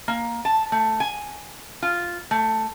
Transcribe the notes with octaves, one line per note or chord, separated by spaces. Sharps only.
A#3
A5
A3
G#5
F4
A3